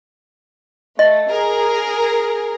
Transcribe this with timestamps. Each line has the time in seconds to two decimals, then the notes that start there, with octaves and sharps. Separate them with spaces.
0.99 A3 D#5
1.30 G#4 A#4